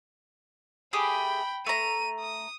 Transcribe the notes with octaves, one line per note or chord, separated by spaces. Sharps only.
A3 G4 G#4 G5 B5
A3 A#5 D#7
D#6